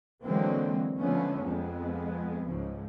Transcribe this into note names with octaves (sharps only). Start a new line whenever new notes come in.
D3 E3 F#3 G#3 A#3 C4
D3 F3 G#3 A3 B3 C#4
F2 G#3 B3
C#2 G#2 F3